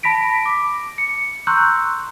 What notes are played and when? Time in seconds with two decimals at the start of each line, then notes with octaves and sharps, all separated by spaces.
0.03 A5 B5 A#6 B6 D7
0.46 D6
0.98 C#7
1.47 A#5 C6 C#6 E6 F#6 G6